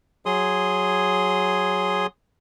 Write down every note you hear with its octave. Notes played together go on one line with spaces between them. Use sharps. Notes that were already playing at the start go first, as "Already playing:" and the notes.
F#3 G#4 C6 D#6